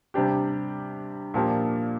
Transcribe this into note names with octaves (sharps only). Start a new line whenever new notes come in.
C3 G3 D4 G4
A#2 F3 A#3 D4 G4